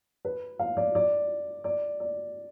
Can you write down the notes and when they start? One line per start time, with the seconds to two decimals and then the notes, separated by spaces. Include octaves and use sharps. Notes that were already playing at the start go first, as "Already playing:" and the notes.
0.25 B4
0.59 F5
0.77 D5
0.95 D5
1.64 D5
2.00 D5